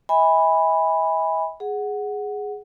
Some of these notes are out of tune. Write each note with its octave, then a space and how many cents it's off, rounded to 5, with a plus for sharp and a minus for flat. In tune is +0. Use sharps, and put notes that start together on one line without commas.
E5 -45 G#5 -25 B5 +0
G#4 +0 F#5 +0